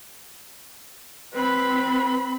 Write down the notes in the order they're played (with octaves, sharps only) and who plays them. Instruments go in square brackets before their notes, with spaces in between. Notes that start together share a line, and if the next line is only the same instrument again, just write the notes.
[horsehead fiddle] C4 B5 [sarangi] B4